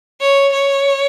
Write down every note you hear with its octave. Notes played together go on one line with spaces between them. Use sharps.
C#5
C#5